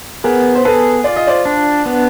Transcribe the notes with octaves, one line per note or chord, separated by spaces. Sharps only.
B3 G#4 A#4
C5
G#4 A4 B4
F4 D5
D#5
C5 D5
D4
B3